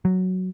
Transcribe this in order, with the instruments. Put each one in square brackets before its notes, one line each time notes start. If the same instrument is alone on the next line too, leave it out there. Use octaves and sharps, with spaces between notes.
[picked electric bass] F#3